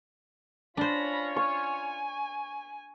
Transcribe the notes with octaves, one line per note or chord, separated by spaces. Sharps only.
C#4 D4 F4 C5 C#5 B5 A#6
G#5 C#6